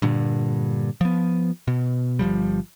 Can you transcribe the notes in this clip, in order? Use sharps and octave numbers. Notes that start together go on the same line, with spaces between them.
G2 A#2 D3
F3 B3
B2
G1 F#2 F3 G3